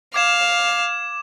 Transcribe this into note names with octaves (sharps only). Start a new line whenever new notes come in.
F5 D6 G#6 E7